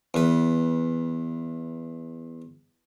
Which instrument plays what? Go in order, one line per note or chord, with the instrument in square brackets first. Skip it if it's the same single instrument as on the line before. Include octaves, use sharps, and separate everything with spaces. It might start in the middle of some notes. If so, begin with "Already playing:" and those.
[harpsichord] E2 B4